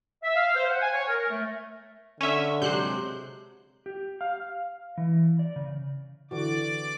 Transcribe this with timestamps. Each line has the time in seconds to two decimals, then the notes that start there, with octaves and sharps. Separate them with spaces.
0.23 E5
0.35 F5
0.55 C5
0.68 F#5
0.81 G#5
0.93 C#5
1.07 A#4
1.28 A3
2.21 D3 C#4 E5
2.62 C3 F#3 G#3 C5 F#6 G6
3.86 G4
4.21 F5
4.97 E3
5.39 D5
5.56 C#3
6.31 D3 E3 F#4 D5 D6